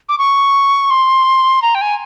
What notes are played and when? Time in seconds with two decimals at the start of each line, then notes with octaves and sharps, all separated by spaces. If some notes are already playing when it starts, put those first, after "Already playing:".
0.09 D6
0.18 C#6
0.90 C6
1.62 A#5
1.75 G5
1.81 G#5